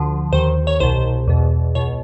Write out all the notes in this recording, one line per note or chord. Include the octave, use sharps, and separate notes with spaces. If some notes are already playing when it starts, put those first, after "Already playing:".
Already playing: D2 D3 F3
D#2 D#3 C5
C#5
C2 B2 C5
E2 B2
C#2 B2 C#5